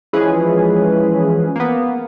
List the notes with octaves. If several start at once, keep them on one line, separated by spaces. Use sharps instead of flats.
E3 F3 G#3 C#4 G#4 B4
A#3 B3